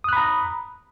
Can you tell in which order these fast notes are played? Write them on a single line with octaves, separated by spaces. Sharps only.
D#6 F#6 B5 A#5